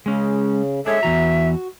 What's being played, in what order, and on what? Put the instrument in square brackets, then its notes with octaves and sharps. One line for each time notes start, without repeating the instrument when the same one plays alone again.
[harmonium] C#3 [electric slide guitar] G#3 C#4
[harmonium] G#3 G#4 A4 [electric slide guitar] D4 C#5 [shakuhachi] E5
[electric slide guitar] E2 E3 A#5 [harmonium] F#4